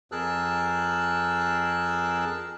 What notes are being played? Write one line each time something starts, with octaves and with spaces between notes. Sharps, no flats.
F2 G#4 A#4 A5 E6 F#6